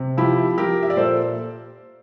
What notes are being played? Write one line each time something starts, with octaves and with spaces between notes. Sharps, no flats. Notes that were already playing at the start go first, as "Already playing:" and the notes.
Already playing: C3
F3 E4 G4
F3 G4 A#4
E5
D5
A#2 A4 C5